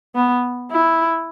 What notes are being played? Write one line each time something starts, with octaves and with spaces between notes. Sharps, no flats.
B3
E4